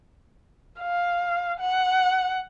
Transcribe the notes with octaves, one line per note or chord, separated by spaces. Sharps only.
F5
F#5